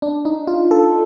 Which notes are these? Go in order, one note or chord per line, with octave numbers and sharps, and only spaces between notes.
D4
D#4
F4
A4